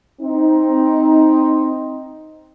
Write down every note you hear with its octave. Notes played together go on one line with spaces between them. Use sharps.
C4 D#4